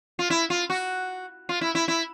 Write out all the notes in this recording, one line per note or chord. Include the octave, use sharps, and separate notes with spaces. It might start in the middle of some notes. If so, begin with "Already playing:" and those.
F4
E4
F4
F#4
F4
E4
E4
E4